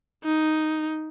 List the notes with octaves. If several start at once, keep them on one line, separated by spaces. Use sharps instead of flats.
D#4